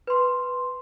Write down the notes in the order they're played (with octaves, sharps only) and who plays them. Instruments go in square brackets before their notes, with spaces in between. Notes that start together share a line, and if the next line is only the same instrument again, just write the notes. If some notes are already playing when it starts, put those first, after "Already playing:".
[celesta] B4 C6